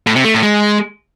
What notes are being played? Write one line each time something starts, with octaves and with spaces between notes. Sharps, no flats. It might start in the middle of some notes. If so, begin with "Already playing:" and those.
A2
C3
A3
A2
G#3